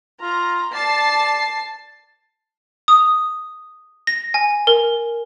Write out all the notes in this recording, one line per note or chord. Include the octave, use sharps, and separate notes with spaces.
F4 A#5
D5 A5 A6 C7
D#6
A#6
G#5
A#4